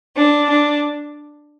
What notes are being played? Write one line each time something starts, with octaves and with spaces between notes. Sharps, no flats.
D4
D4